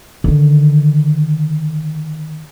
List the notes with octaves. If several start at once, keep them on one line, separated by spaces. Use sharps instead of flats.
D3 D#3